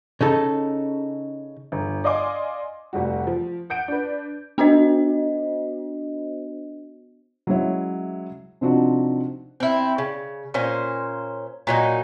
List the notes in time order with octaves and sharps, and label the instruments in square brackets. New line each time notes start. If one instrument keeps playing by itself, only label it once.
[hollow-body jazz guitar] C#3 D#4 A4
[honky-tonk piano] G1
D5 D#5 F5 G#5 C6 D6
F1 G3 F#4
F3
F#5 G6 D7
D4 B4
[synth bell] B3 D4 F#4 C5 D#5
[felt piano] F#3 G#3 C#4 E4 C#5 E5
C3 F3 C4 D4 D#4 F#4
[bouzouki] C4 E4
C#3
A#2 C#4 C5
A#2 F#3 D#4